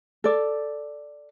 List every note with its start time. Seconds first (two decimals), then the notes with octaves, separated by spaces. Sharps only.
0.24 A4 D5